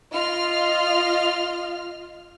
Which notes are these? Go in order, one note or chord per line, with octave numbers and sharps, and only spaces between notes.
F4 D#5 F6